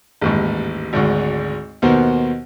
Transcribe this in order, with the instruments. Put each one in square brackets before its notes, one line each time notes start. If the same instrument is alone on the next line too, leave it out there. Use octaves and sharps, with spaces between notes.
[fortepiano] A1 D#2 G#2
G#1 D2 G#2
D#2 B2 B3 A#4 C5